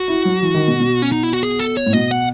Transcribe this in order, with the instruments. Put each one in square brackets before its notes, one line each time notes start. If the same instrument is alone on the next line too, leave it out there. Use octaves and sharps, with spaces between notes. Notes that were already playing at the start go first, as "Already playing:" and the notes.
Already playing: [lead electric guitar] F#4
[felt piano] E4
F#3
E3
D#3
B2
B2
[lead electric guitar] C#4
D#4
E4
F#4
G#4
A4
C#5
[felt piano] A2
[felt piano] B2 [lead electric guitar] D#5
[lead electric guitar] F#5